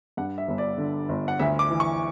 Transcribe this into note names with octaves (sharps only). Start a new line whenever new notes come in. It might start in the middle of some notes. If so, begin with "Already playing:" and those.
G2 F#5
E5
G1
D5
D3
G1
F#5
D2 E5
D6
E3
C#6